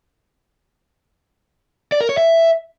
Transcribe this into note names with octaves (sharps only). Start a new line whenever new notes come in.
D5
A#4
C#5
E5